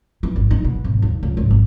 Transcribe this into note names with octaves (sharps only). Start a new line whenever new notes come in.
E3
G#1
D#4
B2
G#1
D#2
C#2
G#2
G#1